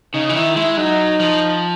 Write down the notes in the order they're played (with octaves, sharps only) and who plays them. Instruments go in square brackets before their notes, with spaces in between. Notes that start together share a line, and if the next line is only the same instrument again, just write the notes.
[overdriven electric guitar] C#3 [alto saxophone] D#4
[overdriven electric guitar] E3
[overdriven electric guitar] D#3 [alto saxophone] E4
[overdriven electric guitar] G#3 [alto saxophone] E4
[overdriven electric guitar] F#3 [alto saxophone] D#4
[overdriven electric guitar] F3